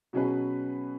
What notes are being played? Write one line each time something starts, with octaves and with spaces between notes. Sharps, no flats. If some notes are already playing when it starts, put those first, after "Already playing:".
B2 F#3 C#4 G#4 B4